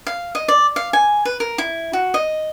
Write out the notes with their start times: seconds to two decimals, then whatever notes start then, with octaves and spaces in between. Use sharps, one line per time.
0.07 F5
0.35 D#5
0.48 D5
0.76 F5
0.93 G#5
1.25 B4
1.40 A#4
1.58 E4
1.93 F#4
2.14 D#5